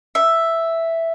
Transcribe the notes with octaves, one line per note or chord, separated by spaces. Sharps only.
E5